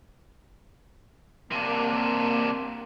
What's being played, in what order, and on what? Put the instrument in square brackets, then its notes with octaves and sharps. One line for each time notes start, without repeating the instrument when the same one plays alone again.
[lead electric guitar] C3 D4 [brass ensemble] A#3